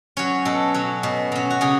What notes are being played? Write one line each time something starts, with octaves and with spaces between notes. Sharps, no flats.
F#3 C#4 C#5
B2 A4
F#3 C#4
B2
F#3 C#4
F#4
C#3 G#4